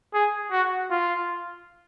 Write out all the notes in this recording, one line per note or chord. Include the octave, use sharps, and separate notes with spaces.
G#4
F#4
F4